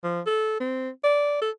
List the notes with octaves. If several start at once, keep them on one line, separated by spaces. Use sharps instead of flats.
F3
A4
C4
D5
A4